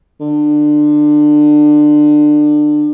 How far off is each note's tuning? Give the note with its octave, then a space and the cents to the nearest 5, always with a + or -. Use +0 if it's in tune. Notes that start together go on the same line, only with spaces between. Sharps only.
D3 +25